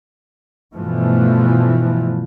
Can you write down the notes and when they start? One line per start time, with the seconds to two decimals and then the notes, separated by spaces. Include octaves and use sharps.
0.74 G2 B2 E3 F3 A3